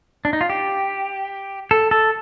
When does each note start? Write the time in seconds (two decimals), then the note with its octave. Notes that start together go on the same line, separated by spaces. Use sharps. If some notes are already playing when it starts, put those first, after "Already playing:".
0.25 D4
0.33 D#4
0.41 F4
0.50 G4
1.71 A4
1.91 A4